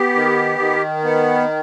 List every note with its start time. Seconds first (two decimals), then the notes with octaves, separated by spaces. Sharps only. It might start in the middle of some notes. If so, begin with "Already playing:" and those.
Already playing: B3 G4
0.15 D#3
0.59 D#3
1.04 B3